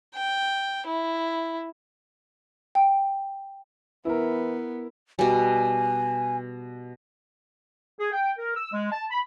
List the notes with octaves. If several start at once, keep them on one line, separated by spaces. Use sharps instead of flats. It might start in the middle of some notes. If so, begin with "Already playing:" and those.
G5
E4
G5
E3 B3 E4 A#4
B2 G3 G#5
G#4
G5
A#4
E6
G#3
A5
B5